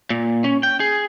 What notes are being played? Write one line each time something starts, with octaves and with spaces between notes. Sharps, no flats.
A#2
C#4
G5
G#4